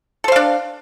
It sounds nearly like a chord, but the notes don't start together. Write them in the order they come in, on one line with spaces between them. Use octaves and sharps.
A4 C5 F5 D4